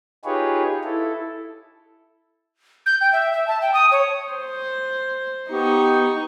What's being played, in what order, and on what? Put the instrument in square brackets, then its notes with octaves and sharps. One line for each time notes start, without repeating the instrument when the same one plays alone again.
[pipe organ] D#4 F4 G4 G#4 B4 C#5
E4 A4
[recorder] G6
G5
E5
E5
A5
G5
D#6
C#5
[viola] C5
[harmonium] B3 G4 [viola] D#4 C#6